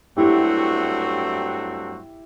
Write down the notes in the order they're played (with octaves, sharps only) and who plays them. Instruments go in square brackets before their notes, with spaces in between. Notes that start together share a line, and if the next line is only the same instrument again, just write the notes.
[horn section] G2 F#3 A3 C4 F#4 [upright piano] E4 G4